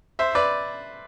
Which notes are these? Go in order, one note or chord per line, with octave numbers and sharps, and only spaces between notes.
C5 E5
B4 D5